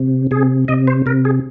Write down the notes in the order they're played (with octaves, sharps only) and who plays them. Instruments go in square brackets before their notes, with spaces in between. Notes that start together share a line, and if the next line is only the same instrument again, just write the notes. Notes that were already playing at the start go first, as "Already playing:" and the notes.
Already playing: [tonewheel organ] C3
C3 G#4
C3 D#5
C5
C3 A#4
G#4